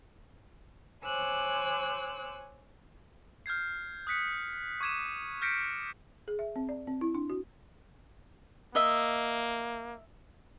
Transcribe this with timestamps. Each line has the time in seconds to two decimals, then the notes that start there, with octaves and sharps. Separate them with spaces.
1.03 C5 C#5 G#5 D6 E6 F#6
3.46 F6 G6 G#6 C7
4.07 D#6 F#6 B6 C#7
4.81 C#6 D6 G#6 D#7 E7
5.42 F6 G6 A#6 B6 C#7 D7
6.28 G#4
6.39 E5
6.56 C4
6.69 D5
6.87 C4
7.01 E4
7.15 D4
7.30 F#4
8.75 A#3 D#5 E5